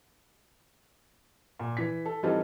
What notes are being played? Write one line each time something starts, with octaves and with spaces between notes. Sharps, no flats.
A#2
E3 B6
A4
E3 G3 C4 D#4 F4 A4